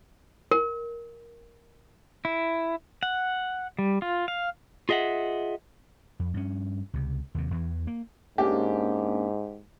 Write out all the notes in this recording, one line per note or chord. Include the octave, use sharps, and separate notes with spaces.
A#4
E4
F#5
G3
F4
F5
F4 G#4 D#5 E5 F#5
F2
G2 C#4
C#2 C3
D#2 C3
E2 E3
A#3
G#2 A#3 C#4 D4 G4